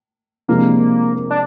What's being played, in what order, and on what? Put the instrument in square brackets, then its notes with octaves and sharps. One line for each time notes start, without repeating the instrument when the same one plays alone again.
[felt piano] C3 F3 G#3 D4 [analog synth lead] A#3
[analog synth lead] D4